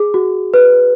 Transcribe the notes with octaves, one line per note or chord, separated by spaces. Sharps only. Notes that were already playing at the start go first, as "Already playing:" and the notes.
Already playing: G#4
F#4
B4